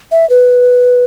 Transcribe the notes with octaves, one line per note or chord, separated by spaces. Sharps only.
E5
B4